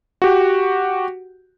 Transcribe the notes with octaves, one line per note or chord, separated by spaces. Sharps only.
F#4 G4